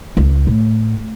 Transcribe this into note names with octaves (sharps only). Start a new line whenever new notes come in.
C#2
A2